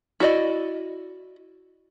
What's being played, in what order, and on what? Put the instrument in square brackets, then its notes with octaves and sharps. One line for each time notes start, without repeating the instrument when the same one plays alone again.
[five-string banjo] E4 F#4 D5 D#5